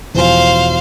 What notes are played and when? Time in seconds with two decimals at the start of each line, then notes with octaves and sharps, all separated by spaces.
0.14 E1 F3 C5 F5 G#5